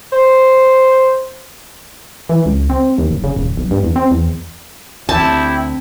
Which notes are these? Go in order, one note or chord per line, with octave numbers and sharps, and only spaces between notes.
C5
E3
C#2
C4
D#2
F#1
C#3
D#1
B1
G2
E2
C4
E2
D2 C4 E4 G4 G5 A5